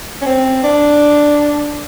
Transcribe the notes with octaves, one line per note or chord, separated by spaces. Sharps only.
C#4
C4
D4